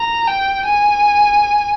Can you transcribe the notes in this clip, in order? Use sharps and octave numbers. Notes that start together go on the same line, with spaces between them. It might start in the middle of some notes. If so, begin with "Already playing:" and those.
Already playing: A#5
G5
G#5